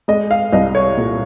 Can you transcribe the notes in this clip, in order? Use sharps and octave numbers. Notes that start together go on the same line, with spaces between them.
G#3 D#5
F5
C2 D#5
C#5
A#2